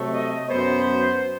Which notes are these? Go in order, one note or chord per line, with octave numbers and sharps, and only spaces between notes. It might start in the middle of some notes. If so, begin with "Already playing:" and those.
Already playing: C3 F#3 A3
D#5
F#2 F#3 B3 C5